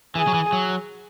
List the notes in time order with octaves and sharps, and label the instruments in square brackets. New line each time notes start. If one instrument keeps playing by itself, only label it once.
[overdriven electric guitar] E3 [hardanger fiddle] G#4
[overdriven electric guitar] F#3
E3
F#3